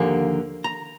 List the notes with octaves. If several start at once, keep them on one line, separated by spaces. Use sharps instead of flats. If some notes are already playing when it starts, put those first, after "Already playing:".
Already playing: D#2 D3 F3 A#3 G#5
A#5